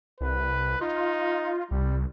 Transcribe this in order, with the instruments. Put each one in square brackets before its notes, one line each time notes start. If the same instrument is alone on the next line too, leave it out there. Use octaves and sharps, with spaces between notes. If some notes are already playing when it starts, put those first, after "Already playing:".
[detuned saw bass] C2 [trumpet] B4
[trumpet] D#4 [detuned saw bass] F4
[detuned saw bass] C2 [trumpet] G3